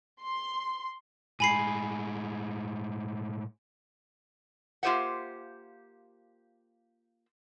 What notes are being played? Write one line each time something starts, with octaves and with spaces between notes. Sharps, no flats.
C6
A2 G#3 G#5 B5 C7
A#3 F4 G4 C5 E5 F#5